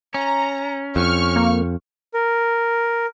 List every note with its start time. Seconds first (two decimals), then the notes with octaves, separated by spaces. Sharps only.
0.14 C#4 A#5
0.96 F2 C#6 F6
1.36 A#3
2.14 A#4